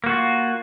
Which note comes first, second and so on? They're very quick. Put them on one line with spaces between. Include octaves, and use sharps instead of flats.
A#3 F#4 F4